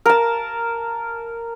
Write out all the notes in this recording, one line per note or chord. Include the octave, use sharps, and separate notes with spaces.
A#4 A5